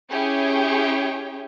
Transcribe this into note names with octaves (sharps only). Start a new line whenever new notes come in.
C#4 E4 G4 G#4 C#5 G5